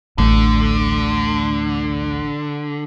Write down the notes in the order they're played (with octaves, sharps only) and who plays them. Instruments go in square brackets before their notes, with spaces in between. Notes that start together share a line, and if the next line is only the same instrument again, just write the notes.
[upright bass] A1 G3 [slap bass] D2 A3 [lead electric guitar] D3